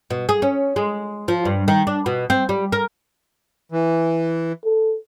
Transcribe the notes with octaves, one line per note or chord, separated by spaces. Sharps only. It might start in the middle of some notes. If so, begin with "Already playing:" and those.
B2
G#4
C#4
G#3
F3
G2
D#3
D4
B2
C4
G3
A#4
E3
A4